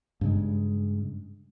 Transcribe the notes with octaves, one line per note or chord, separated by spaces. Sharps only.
G2 C#3 G#3